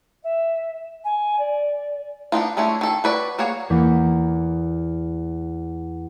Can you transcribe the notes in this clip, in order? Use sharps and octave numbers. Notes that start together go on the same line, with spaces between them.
E5
G#5
D5
B3 D4 D#4 F4
G#3 A3 C#4 D4 E4
D#3 A4
F#4 B4 D5
A#3 F#4 G#4 C#5
E2 A#3 G6 B6